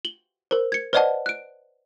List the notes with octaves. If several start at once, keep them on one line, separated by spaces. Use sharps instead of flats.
F#7 G7
A#4 C5
G#6 C#7
B4 C5 D5 D#5 F#5 A5
F#6 D7